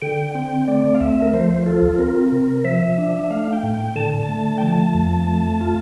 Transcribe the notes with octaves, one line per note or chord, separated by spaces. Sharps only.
D3 G5
C4 G5
A3 D5
F5
D2 E5
A#4
F3 C5
F4 A4
C4 A#4
C3
F3 E5
D4
E5
A3 F5
G5
A2
G5
D3 A5
A5
A3
G5
F3 A5
F2
A3
F4